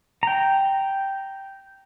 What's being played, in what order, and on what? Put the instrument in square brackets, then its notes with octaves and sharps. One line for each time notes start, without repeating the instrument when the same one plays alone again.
[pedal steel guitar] G5 A#5